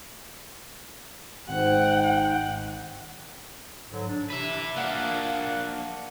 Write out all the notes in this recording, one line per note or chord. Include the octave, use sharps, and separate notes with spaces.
G#1 G#2 F#5 G5
G#2 D3 F#3
D4
C3 B4 E5
A#3 D4 F5 F#5